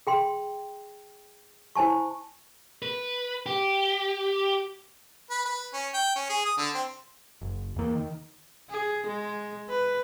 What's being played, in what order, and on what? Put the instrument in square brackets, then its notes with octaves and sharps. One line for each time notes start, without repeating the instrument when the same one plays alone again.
[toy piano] G#4 G5 C6
E4 C5 G#5 A5 C#6
[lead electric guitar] B4
G4
[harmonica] B4
B4
C#4
G5
C#4
G#4
D#6
D3
C4
[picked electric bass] F#1
E2 A#3
D#3
[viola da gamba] G#4
G#3
B4